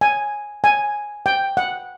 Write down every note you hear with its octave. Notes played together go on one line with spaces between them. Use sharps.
G#5
G#5
G5
F#5